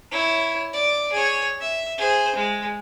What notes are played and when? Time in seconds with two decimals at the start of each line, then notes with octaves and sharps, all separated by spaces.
0.12 E4 C#5
0.73 D5
1.12 G#4 C#5
1.60 E5
1.98 G#4 C5
2.36 G#3